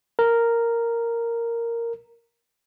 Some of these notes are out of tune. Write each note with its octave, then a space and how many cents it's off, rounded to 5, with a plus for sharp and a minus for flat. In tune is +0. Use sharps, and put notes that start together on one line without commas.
A#4 -5